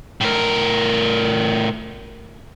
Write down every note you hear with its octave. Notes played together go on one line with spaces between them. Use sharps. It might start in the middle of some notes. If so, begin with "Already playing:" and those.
A2 A#4